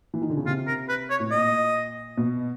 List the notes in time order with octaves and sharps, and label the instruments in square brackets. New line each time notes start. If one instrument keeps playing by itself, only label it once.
[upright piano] E3
D#3
D3
C#3
[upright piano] C3 [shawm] F4
[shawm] A#4
B4
C#5
[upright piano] A2
[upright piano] A#2 [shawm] D#5
[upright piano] B2